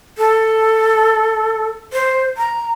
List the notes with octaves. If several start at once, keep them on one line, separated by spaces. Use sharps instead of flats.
A4
C5
A#5